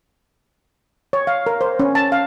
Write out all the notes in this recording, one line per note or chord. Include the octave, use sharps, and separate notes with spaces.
C#5
F5
A#4
C5
C#4
A5
F5